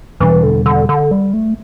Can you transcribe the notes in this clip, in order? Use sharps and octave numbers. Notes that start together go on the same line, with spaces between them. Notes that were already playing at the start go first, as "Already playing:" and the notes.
E2 B2 E3 G3 D4
D3
D3
D3
G3
A3